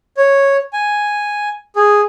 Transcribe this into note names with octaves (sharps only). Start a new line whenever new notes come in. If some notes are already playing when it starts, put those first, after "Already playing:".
C#5
G#5
G#4